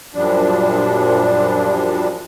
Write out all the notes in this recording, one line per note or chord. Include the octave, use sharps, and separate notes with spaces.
F#2 A#2 F3 G3 D4